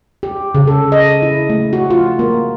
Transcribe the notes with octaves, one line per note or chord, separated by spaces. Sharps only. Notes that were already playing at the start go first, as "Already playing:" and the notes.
G4
C#3
A4
D#5
E4
A3
F#4
F4
A#3